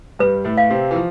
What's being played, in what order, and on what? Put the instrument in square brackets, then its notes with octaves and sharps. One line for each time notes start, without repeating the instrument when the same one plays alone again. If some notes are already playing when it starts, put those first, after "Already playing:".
[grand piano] G2 G3 [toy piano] B4
[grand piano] A2 A3
[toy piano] F5
[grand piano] C3 C4
E3
F3